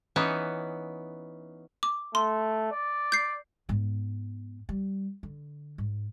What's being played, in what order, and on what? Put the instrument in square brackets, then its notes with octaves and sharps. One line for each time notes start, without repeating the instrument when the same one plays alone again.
[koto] E3 B3 C#4 D#4
[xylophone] D6
[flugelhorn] A3 [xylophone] C6
[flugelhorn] D5
[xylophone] G6 C7
[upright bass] G#2 B3
G3
D3
G#2